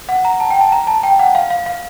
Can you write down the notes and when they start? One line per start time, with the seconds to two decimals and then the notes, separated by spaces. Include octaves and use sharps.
0.09 F#5
0.25 A#5
0.40 A5
0.50 G5
0.61 A5
0.72 A#5
0.87 A5
1.03 G5
1.19 F#5
1.35 F5
1.50 F5
1.66 F5